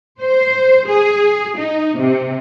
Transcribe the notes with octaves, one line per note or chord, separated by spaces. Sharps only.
C5
G#4
D#4
C3